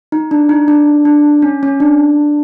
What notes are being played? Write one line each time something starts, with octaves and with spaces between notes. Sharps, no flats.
D#4
D4
D#4
D4
D4
C#4
C#4
D4